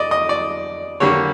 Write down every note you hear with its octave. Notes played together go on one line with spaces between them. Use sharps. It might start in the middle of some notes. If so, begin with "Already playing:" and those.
Already playing: D5 D#5
D#5
D5
D3 G3 A#3 C#5